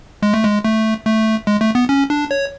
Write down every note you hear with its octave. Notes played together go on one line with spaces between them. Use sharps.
G#3
A3
G#3
A3
A3
G#3
A3
B3
C#4
D4
C#5